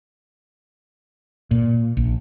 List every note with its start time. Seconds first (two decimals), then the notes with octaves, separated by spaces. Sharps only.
1.51 A#2
1.97 A#1